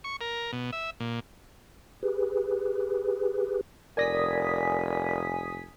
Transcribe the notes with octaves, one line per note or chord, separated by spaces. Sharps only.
C#6
A#4
B2
E5
A#2
G4 G#4 B4
F1 A#4 D5 G#5 D#6 A#6 B6